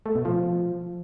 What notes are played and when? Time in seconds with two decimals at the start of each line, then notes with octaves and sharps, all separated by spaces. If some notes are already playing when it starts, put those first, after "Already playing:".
0.06 A3
0.15 B2
0.25 F3